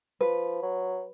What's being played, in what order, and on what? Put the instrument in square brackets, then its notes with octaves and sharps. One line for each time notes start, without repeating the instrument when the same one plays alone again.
[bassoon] F3 [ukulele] B4
[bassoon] F#3